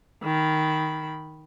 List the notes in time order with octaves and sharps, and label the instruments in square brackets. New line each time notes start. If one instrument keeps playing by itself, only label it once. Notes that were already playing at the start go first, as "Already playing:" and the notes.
[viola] D#3 B5